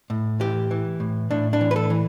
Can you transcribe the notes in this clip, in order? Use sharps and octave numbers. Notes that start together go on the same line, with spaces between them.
A2
E3 G4
E3
A2
A2 D4
D4
E3
B4
A4
E3